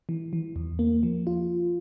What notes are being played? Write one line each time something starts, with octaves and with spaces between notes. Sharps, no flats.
E3
E3
E2
A#3
F3
F4